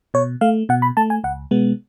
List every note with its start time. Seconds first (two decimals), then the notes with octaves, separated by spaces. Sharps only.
0.14 B2 C#5
0.41 A3 F5
0.69 B2 F#5
0.82 B5
0.97 A3 A5
1.10 G#5
1.24 C#2 F#5
1.51 B2 G#3 B3